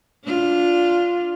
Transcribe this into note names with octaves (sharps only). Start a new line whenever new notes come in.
D4 F4